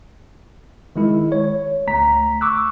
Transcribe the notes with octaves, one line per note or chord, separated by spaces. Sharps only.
D#3 G#3 E4
C#5
D2 A3 A#5 B6
C#6 D6 E6 F#6